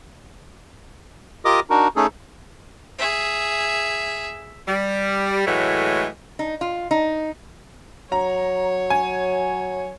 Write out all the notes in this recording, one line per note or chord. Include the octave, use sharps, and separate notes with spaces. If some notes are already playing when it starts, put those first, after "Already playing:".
F4 G4 A#4 D#5 D6 D#6
D4 D#4 F#4 A#4
A3 C#4 D#4 G#4 A4
G#4 E5
G3
A2 E3 F#3 G#3 A3
D#4
F4
D#4
F#3 C#5 A#5
G#5